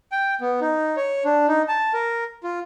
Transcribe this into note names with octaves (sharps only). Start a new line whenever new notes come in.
G5
B3
D#4
C#5
D4
D#4
A5
A#4
F4